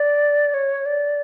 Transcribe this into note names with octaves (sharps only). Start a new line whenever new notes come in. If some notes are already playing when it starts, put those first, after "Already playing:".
Already playing: D5
C#5
D5